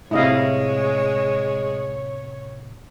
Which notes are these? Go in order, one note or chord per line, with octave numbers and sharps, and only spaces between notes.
A2 C3 G#3 E4 C#5 D#5 F5